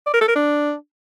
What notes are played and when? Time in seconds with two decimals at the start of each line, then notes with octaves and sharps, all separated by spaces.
0.06 D5
0.14 A#4
0.21 A4
0.28 A#4
0.36 D4